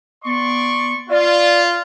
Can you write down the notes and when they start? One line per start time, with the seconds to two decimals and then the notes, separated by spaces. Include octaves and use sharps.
0.25 B3 D5 C6 C#6
1.10 F4 D5